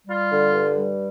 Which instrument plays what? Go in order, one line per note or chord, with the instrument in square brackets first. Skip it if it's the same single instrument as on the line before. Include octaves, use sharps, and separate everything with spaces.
[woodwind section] G3 F4
D3
G2
G3